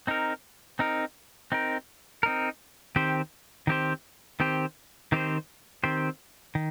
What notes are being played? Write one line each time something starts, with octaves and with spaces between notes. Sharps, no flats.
C4 D#4 A#4
C4 D#4 A#4
C4 D#4 A#4
C4 D#4 A#4
D#3 C4 G4 C5
D#3 C4 G4 C5
D#3 C4 G4 C5
D#3 C4 G4 C5
D#3 C4 G4 C5
D#3